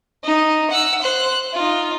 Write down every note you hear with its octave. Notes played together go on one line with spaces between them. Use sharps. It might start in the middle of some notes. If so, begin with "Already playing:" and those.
D#4
F#5 E6
C5 F#6
D#4 F4